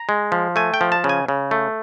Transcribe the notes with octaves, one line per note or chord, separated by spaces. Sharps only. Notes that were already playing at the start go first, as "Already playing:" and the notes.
Already playing: A#5
G#3
F3
A3 G#5
G5
F3
A5
C#3
G#5
C#3
A3